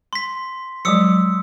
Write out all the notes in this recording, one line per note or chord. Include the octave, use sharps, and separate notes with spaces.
C6 B6
F3 F#3 G#3 D#6 E6 C#7